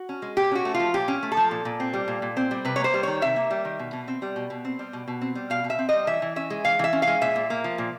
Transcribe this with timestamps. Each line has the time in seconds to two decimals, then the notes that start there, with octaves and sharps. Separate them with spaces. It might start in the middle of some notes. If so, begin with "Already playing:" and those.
Already playing: F#4
0.09 C#4
0.22 G#3
0.37 A#2 G4
0.51 C#4 F#4
0.65 A3
0.74 F4
0.80 F3
0.94 A#2 G4
1.08 C#4
1.23 A3
1.32 A4
1.37 F3
1.51 A#2
1.65 A#2
1.80 C4
1.93 G3
2.08 A#2
2.22 A#2
2.37 C4
2.51 G3
2.65 C3 B4
2.76 C#5
2.80 A#3 C5
2.94 G3
3.03 D#3 C#5
3.22 C3 E5
3.36 A#3
3.51 G3
3.65 D#3
3.79 B2
3.93 B2
4.08 C4
4.22 G3
4.36 B2
4.50 B2
4.65 C4
4.79 G3
4.93 B2
5.08 B2
5.22 C4
5.35 G3
5.50 B2 F5
5.64 B2
5.70 E5
5.79 C4
5.89 G3 D#5
6.07 E3 E5
6.22 E3
6.36 C#4 E5
6.50 G#3
6.65 E3 F5
6.79 E3 E5
6.93 C#4
7.02 F5
7.07 G#3
7.21 A#2 E5
7.36 A#2
7.50 A#3
7.64 F3
7.78 A#2